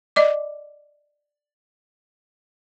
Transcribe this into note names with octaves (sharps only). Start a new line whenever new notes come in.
D5 D#5 D6